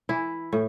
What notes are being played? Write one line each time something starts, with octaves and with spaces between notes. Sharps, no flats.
E3 E4
A2